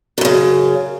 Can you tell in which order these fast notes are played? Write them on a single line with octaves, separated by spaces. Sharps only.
F#2 A2 C#3